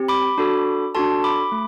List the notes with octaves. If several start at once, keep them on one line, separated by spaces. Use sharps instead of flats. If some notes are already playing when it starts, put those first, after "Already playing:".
Already playing: C4 G4
B5 D6
D4 F#4 A4
D4 F#4 A4 A5 C6
B5 D6
A3